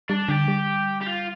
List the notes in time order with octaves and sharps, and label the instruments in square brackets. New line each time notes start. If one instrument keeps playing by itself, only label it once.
[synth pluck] G3 [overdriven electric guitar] D4
[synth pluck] D3 [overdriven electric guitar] G4
[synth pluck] G3
[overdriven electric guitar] G4
F4